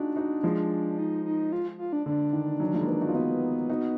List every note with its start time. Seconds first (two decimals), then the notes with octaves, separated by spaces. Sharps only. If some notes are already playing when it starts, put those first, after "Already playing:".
Already playing: D4 D#4 F4 F#4 G#4
0.16 D#4 F#4
0.43 F3 G#3
0.98 D#4
1.25 D#4
1.52 F4
1.78 F4
1.93 D4
2.06 D3 D4
2.33 D#3
2.60 D#3 F#3
2.73 F3 G#3
2.81 A#3
2.88 G#3 B3
3.01 D#4 F#4
3.08 F4
3.15 B3 D#4 F#4
3.70 D#4 F#4